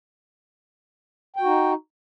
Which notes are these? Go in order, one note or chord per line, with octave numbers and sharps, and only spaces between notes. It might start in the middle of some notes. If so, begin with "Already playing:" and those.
D#4 F#4 G5